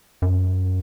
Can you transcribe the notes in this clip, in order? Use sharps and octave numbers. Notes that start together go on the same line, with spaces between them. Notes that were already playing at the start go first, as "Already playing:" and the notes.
F#2